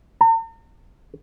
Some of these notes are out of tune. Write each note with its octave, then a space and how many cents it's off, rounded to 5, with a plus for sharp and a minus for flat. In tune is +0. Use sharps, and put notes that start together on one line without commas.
A#5 -45